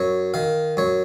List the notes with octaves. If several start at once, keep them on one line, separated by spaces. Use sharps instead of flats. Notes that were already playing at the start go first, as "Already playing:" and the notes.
Already playing: F#2 C#5
D#3 F5
F#2 C#5